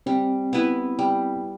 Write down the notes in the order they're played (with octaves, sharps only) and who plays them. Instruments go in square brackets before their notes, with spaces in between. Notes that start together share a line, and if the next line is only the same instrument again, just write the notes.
[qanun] G3 [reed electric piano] C4
[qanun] B3 E4 B4
G3